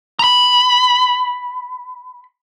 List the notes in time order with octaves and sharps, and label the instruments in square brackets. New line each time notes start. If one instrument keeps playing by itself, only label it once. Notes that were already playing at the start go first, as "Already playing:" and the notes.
[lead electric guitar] A#5 B5